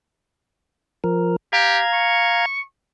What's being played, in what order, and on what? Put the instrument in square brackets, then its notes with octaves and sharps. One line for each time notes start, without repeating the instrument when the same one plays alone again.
[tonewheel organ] F3 A#4
[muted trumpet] G4 [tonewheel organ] F5 A#5 G#6
[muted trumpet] C#6